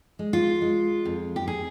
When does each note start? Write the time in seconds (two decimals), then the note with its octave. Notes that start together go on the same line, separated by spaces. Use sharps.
0.19 G#3
0.33 F4
0.62 G#3
1.05 F2
1.36 G4
1.48 G#4